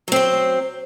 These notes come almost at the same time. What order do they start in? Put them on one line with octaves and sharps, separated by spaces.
F#3 C4 C5